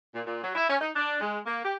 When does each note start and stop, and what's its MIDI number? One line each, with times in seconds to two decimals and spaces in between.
0.14 0.22 46
0.26 0.42 46
0.43 0.54 54
0.55 0.69 64
0.69 0.76 61
0.80 0.89 63
0.95 1.17 62
1.21 1.39 56
1.46 1.61 58
1.64 1.74 67